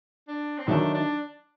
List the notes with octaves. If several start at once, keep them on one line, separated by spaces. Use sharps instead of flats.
D4
C4
D#3 F#3 A3 D4 D#4 A4
D4